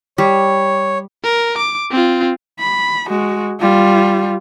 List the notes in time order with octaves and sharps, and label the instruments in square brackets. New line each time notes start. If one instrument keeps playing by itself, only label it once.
[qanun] G3 [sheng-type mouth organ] C#5
[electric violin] A#4
D6
C4 F4
[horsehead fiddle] B5
G#3 F#4
G3 F4